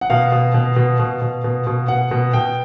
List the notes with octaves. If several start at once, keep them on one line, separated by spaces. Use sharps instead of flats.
F#5
B2 F5
B2
B2
B2
B2
B2
B2
B2
B2 F#5
B2
B2 G5